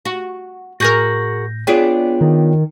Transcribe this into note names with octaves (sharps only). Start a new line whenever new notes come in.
F#4
A2 F#4 G#4 A#4 G6 A#6
B3 D4 F4 G#4 C#5 G5
D#3